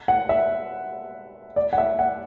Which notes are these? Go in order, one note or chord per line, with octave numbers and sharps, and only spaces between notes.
F#5
E5
D5
F#5
E5
F#5